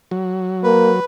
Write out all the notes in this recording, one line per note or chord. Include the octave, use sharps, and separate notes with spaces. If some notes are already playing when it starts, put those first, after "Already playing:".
F#3
A#3 B4